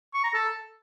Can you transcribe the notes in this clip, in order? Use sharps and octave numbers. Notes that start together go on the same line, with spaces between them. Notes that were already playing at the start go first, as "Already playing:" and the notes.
C#6
A#5
A4